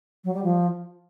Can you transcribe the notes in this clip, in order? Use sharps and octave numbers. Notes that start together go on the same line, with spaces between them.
F#3
G3
F3